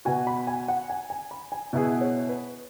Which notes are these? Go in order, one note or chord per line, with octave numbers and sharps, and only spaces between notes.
B2 B3 F#4 G#5
B5
G#5
F#5
G#5
G#5
B5
G#5
B2 B3 E4 G#4 E5
C#5
B4